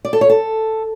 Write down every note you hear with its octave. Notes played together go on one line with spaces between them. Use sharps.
D5
A4
C#5
A4